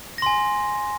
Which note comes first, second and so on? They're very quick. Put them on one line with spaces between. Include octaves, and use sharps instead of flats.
A#6 C6 G#5